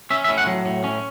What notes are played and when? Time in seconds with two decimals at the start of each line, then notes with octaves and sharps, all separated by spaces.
0.11 C#4 E5
0.24 E5
0.29 A2
0.38 F#5
0.47 F#3
0.66 A2
0.84 C#4